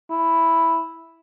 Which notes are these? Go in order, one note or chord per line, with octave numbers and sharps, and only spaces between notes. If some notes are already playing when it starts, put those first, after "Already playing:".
E4